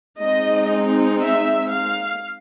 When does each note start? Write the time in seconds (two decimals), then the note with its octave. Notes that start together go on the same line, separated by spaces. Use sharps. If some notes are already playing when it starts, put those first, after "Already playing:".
0.21 G#3 C4 D#4 D#5
1.22 E5
1.74 F5